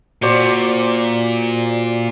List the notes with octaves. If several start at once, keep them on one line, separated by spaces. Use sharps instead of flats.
A#2 F#4 C5 D5